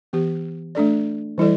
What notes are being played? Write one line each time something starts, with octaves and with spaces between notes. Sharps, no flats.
E3 B3 G4
A3 D4 A4 D5
E3 G3 E4 A4 D5